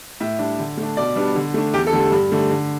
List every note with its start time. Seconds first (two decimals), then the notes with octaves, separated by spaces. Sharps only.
0.20 A2 E5
0.39 G3 D4
0.59 D3
0.77 A3
0.83 D4
0.97 B2 D5
1.16 G3 B3 D4
1.36 D3
1.54 A3 D4
1.73 E2 G4
1.87 A4
1.92 D3 A3
2.12 G2
2.32 D3 A3
2.51 D3